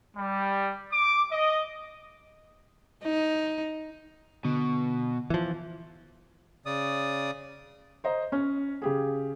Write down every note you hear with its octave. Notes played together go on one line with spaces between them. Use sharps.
G3
D6
D#5
D#4
B2 D3
E3 F3
C#3 D5 D#6
C5 D#5 A#5
C#4 C#5
C#3 G4 G#4